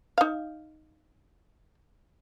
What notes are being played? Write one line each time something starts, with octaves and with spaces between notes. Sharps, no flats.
D#4 F5